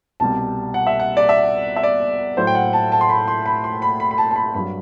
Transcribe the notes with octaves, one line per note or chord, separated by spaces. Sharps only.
C2 B2 G3 A5
F#5
E5
F#5
D5
E5
E5
D5
A2 F#3 C5
G5
F#5
A5
A5
C6
B5
C6
B5
C6
B5
B5
B5
A5
A5
B5
G2 F#3 B5